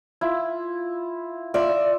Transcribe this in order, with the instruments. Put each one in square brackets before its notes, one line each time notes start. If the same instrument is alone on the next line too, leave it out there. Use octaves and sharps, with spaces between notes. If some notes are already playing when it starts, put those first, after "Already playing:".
[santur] E4 F4
[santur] F4 [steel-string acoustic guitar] D5 E5